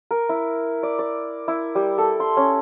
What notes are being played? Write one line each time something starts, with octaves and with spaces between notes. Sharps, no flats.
A#4
E4
D5
D5
E4
G3
A4
C6
C#4